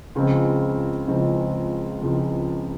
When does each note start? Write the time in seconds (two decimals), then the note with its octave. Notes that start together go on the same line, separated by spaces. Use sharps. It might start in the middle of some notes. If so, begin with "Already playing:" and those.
0.15 C#2 C#3 F3 G#3 C4
1.08 C#2 C#3 F3 G#3 C4
2.02 C#2 C#3 F3 G#3 C4